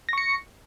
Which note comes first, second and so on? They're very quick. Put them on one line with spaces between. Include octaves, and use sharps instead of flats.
A#6 C#6 C#7